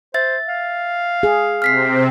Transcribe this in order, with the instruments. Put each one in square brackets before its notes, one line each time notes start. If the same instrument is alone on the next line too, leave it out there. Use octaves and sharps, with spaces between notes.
[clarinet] C5 [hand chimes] E5 A6
[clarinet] F5
[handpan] G#4
[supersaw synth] C3 C4 [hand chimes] F6 B6 C7